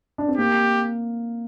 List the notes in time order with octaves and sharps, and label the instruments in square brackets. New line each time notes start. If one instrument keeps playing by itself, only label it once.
[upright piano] D4
C4
[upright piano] A#3 [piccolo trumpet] G4